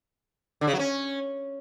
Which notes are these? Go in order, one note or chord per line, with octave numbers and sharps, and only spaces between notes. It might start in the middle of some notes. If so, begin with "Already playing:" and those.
D3
C#3
F#3
C#4